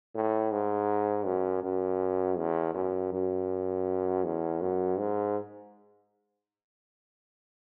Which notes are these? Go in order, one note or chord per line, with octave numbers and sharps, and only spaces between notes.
A2
G#2
F#2
F#2
E2
F#2
F#2
E2
F#2
G#2